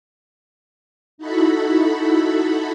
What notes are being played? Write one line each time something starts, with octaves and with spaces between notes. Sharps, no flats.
D#4 E4 F#4 A4 B5